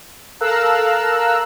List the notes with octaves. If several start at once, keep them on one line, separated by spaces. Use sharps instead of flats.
A4 A#4 F5 A#5 E6 F#6